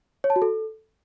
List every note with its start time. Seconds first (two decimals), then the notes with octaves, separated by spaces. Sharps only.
0.24 C#5
0.30 A5
0.36 F#4
0.42 A4